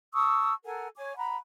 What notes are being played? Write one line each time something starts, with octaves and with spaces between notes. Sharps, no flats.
A5 C#6 D#6 E6
A4 A#4 F#5 G#5
C#5 G#5 D6
F#5 A#5 B5